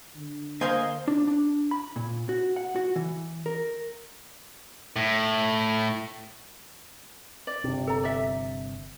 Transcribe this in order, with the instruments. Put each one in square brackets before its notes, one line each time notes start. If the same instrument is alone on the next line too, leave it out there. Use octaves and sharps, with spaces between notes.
[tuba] D3
[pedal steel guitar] A#3 D#5 G#5 [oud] C5 F5
[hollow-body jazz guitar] D4
D4
B5
A#2
F#4
F#5
F#4
E3
A#4
[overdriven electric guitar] A2
[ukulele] D5
[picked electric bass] G1 C3
[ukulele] A4 A#5
D5 E5